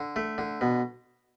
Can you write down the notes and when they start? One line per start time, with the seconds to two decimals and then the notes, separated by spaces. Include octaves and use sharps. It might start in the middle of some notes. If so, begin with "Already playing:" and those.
Already playing: D3
0.16 A3
0.38 D3
0.61 B2